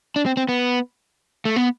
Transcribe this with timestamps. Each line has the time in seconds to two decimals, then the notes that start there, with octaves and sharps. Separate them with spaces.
0.16 D4
0.26 C4
0.37 C4
0.49 B3
1.45 A3
1.56 B3